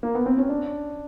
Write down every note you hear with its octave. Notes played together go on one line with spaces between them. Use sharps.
A#3
B3
C4
C#4
D4